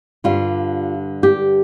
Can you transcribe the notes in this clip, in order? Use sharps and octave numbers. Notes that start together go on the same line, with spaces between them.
G2 D3 G3 F4
G4